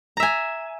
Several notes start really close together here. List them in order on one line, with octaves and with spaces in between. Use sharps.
A#5 E5 G#5